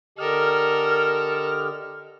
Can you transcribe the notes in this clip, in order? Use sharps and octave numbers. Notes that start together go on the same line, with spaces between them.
D3 G4 A4 A#4 D#5 F6